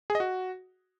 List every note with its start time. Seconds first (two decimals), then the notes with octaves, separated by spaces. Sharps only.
0.10 G#4
0.15 D#5
0.20 F#4